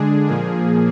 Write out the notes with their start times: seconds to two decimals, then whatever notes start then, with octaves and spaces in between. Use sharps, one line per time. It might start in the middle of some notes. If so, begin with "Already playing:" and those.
Already playing: D3 G#3 D4 G#4
0.27 A#2 F3 A#3 G#4